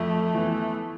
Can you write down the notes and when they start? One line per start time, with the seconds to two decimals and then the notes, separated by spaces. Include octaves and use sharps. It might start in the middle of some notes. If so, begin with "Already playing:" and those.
Already playing: F2 A3
0.34 E3 B3 E4